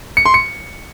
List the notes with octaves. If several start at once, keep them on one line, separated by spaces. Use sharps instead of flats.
C#7
C6
C#7